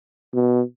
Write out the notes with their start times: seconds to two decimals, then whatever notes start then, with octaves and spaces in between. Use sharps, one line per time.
0.34 B2